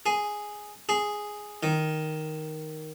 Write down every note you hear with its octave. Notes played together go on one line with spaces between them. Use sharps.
G#4
G#4
D#3